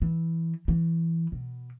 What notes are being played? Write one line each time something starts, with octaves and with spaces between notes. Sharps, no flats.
E3
E3
B2